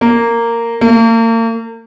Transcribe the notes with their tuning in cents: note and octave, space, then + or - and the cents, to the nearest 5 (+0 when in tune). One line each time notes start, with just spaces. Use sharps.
A#3 -10
A#3 -40